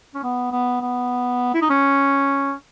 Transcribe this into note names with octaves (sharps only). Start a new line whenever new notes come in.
C#4
B3
B3
B3
E4
D#4
C#4